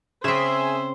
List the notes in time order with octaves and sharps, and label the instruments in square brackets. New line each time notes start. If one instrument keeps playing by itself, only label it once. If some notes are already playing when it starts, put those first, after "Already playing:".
[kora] C#3 C4 [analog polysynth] G#4 E5 [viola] C5